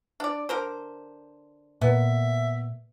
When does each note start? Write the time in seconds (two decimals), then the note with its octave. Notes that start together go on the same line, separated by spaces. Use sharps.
0.20 D4 D5
0.49 D3 A#4 C5
1.81 A#2 B3 E5